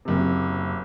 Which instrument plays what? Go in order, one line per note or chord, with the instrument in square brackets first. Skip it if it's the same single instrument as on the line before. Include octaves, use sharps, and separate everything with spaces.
[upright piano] F#1 C3